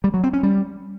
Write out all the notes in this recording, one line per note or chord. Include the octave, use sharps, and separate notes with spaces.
G3
F#3
C4
C#4
G3